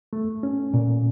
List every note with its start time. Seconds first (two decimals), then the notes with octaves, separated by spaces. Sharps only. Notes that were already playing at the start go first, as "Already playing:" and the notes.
0.13 A3
0.43 C#4
0.74 A#2